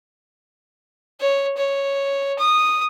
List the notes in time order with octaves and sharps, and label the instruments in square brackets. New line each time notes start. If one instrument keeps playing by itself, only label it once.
[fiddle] C#5
C#5
D#6